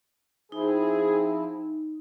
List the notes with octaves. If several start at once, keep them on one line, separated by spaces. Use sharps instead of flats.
F3 C4 D#4 E4 G#4